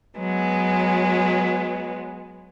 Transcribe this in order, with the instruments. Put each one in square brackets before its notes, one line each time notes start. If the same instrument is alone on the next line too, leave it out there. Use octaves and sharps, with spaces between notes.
[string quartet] F#3 G#3 B3